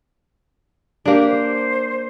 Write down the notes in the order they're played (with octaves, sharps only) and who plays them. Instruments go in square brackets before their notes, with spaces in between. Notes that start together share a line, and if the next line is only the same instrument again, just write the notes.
[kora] A#3 D4 [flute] G4
[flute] C5